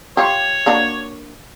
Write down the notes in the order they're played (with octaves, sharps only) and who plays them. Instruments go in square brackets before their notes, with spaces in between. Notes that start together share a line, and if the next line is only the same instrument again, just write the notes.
[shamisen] F4 G4 [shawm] C#5
[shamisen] A#3 D4 F#4